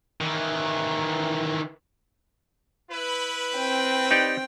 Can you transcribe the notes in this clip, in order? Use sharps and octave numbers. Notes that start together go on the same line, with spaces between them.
D#3 E3
E4 B4
C4 G5
D#4 G4 D5